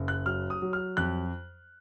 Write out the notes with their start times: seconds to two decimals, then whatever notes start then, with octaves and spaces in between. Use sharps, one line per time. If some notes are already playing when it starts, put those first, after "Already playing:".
Already playing: F#1
0.08 F#6
0.26 F#3 F6
0.50 D#6
0.62 F#3
0.73 F6
0.97 F2 F#6